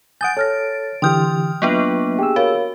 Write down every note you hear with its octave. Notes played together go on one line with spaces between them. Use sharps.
F#5 G#5 D#6 G6 A6 D7
A4 C#5 F6 A#6
D3 E3 G4 G5 C6 D#6 F6 G6
F#3 A#3 B3 D4 F4 B4
G4 G#4 G5 E6
F#4 A#4 C#5 F5